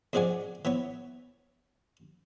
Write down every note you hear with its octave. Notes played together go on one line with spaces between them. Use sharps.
F2 G#2 G#3 D5 F#5 G#5
E3 B3 C#5